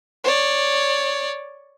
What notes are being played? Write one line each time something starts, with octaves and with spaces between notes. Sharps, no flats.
C#5 D5